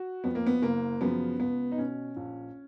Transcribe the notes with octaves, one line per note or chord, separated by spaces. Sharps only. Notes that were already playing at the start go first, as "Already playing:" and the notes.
Already playing: F#4
F2 F3 B3
A#3
B3
F#1 A#3
F#2 C#3 F3 B3
C#2 B3
D#4
B2 C#4
A#1